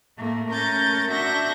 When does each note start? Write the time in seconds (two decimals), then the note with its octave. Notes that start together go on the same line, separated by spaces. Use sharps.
0.18 A2 A3 A#3
0.50 A3 C#4 A#4 G6 A6
1.11 D4 F#4 E5 C#6 G6 A#6